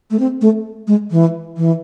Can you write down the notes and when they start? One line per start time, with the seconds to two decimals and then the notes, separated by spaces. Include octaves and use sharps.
0.11 A3
0.19 C4
0.41 A3
0.87 G#3
1.11 E3
1.57 E3